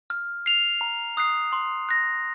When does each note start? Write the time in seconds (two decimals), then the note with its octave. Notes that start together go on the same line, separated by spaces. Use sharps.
0.10 F6
0.46 C7 F7
0.81 A#5
1.17 D#6 F#6 C7
1.52 C6
1.89 F#6 A#6